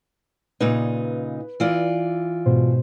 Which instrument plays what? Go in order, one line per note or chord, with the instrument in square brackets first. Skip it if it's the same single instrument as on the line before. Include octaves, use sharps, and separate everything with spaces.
[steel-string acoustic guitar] A#2 C#3 D#4 [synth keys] B4
[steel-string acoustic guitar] E3 F4 D5
[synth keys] G#2 B2 C5